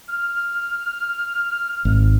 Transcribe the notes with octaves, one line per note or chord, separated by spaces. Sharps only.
F6
G#1